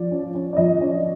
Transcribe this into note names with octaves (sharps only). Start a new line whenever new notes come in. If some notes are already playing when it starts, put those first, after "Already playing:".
Already playing: F3 D5
C#4
C#4
D5
F3 D#5
C#4